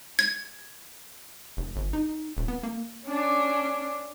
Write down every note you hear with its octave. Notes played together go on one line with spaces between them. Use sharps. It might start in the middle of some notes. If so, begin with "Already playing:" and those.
G#6
F1
G1
D#4
D#1
B3
A#3
C#4 D4